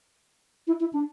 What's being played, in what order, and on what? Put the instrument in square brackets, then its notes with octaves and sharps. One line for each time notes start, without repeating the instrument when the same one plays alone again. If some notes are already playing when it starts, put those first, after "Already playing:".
[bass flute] E4
E4
D4